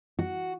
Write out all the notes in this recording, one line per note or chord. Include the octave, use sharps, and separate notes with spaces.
F#4